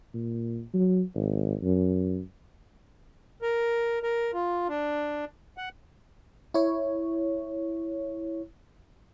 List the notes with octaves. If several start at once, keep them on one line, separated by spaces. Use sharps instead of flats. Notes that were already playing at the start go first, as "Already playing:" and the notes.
A#2
F#3
G#1
F#2
A#4
A#4
F4
D4
F#5
E4 C#5